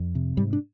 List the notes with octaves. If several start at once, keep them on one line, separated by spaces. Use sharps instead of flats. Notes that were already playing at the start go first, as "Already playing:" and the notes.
Already playing: F2
C3
G#2 G3
D4